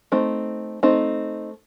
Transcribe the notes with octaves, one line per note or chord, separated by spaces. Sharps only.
A3 C4 D#4
A3 C4 D#4